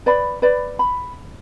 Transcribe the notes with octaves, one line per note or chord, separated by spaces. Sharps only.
B4 D5 B5
B4 D5 B5
B5